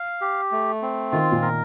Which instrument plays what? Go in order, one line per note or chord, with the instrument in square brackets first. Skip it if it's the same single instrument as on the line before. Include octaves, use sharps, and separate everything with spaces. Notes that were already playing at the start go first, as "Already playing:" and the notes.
Already playing: [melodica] F5
G4
A3
C4
[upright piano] D#3 [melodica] F4
[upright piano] A#2
[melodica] A#4